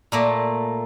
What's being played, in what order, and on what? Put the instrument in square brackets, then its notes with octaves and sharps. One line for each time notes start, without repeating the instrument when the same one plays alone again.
[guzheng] A#2 A3 A#3